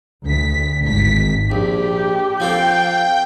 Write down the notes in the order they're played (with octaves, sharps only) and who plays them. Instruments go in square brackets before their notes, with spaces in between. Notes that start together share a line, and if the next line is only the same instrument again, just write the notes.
[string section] D2 B6
G#1 B6
[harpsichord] A#1 [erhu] G4
[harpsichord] F3 C4 A4 [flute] F5 [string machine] G5 [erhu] G6